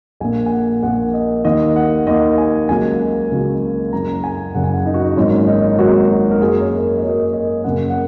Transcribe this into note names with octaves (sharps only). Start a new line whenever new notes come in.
A#1 A#2 A#3 G#5
G#5
F#5
A#1 A#2 A#3 F#5
D#5
D#2 D#3 A#3 D#5
F#5
D#2 D#3 A#3 D#5
G#5
C#2 C#3 F#3 A#3 G#5
C#2 C#3 F#3 A#3
F#1 F#2 C#3 A#5
G#5
F#1 F#2 C#3 F#5
G#5
F#5
D#4
F#4
D#4
G#1 G#2 F#3 A#3 C#4
D#4
G#1 G#2 F#3 A#3 F#4
A#4
F#2 F#3 A#3 G#4
C#5
A#4
D#5
F#2 F#3 A#3 C#5
D#5
F#2 C#3 A#3 F#5
F#5